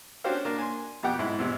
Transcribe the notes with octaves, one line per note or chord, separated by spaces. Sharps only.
C#4 D4 F#4 G4 C5 F5
A#3 D4
G#5 C6
F2 B2 G4 F#5 G5
G#2 E4
E2 G#2 C3